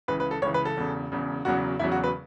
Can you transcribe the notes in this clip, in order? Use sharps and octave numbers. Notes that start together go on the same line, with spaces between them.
C#2 C#3 E3 B4
B4
A4
C#2 C#3 E3 C#5
B4
A4
E1 E2 C#3
E1 E2 C#3
E1 E2 C#3 F#3 F#4
E1 E2 C#3 F#3 E4
F#4
B4